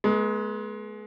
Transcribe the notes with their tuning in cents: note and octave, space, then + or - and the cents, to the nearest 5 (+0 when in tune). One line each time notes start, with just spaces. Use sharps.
G#3 +30 B3 -30